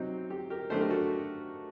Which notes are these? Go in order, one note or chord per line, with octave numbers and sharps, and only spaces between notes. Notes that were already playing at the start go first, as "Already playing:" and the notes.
Already playing: C3 F#3 C4 D#4
G4
G4 A#4
D#3 F#3 A3 D4 A4 C5
G4 A#4
F#4 A4